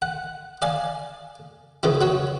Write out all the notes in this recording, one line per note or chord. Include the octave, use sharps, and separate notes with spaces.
F#5
D5 F5 G#5
C#3 E3 F3 E4
F#3 F#4 C#5